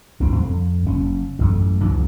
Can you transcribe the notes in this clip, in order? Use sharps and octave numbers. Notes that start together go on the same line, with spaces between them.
G1 D2 C4
F2
F#1 C#4
A1 F#2 A3
C#2 C#3 E3 F#3